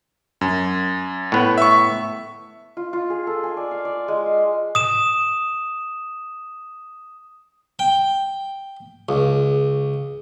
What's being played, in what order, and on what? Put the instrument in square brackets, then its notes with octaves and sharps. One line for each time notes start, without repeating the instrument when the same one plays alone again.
[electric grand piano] F#2
[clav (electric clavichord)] A2 B3
[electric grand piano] E5 C#6
[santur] F4
F4
G#4
A4
G#5
D5
F5
D5
G#3
F5
[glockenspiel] D#6 E7
[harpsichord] G5
C#2